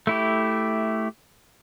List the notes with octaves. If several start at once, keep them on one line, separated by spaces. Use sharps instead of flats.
A3 E4 G4